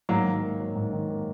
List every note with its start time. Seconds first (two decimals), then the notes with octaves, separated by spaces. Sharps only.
0.09 G#2 F#3 A#3
0.25 D#3
0.42 A#3
0.60 F#3
0.75 G#2
0.93 D#3
1.10 A#3